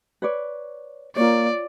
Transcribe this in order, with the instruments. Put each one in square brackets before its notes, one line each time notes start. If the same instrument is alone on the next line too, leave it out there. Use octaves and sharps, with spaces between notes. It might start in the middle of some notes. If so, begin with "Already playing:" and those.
[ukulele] B4 C#5 D5
[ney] A#3 [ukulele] F4 C#5 [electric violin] D5